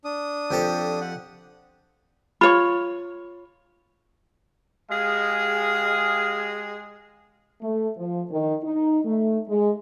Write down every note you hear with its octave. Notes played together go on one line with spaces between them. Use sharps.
D4 D#6
F2 G4 A4
F#5
F4 C#5 B5 C#6
G#3 G4 G#4 F5
A3
F3
D#3
D#4
A3
G#3